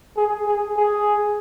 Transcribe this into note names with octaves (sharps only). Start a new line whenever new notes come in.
G#4
G#4
G#4